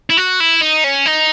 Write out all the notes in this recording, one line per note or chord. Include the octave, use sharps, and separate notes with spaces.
E4
F#4
E4
D#4
C#4
D#4